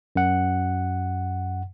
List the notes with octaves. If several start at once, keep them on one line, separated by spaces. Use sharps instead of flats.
F#2 F#5